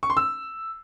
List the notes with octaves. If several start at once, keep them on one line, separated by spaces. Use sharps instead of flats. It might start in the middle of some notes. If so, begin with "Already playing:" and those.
C#6
C6
E6